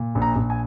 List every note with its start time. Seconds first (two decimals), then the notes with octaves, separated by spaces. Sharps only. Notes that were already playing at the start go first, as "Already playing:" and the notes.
Already playing: A#2
0.15 A#1
0.22 A#5
0.36 A#1
0.50 G#5